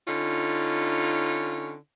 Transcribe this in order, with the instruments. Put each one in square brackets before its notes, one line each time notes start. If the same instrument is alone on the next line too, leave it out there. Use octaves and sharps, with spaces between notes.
[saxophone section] D3 C#4 D#4 F4